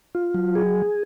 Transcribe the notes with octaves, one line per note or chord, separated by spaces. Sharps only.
F4
F#3
G#4